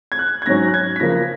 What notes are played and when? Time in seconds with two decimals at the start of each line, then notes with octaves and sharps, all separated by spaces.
0.12 G#6
0.19 F#6
0.42 G#6
0.46 G#2 F#3 C#4 A#6
0.68 F#6
0.74 G#6
0.96 B6
1.00 C#3 F3 A#3 A#6